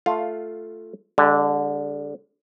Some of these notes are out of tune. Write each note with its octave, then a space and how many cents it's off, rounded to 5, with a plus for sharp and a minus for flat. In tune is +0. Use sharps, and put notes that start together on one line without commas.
A3 +0 F4 +0 F5 +15
D3 -10 G3 +45